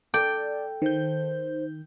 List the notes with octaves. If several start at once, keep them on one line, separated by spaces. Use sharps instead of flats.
A4 D5 G5
D#3 C5 G6